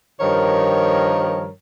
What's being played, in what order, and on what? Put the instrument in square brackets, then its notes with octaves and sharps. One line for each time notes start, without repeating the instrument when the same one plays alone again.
[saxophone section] G2 D#3 F3 A#4 C#5